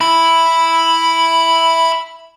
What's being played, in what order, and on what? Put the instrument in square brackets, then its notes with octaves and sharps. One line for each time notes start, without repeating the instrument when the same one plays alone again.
[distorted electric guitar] E4 [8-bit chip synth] B5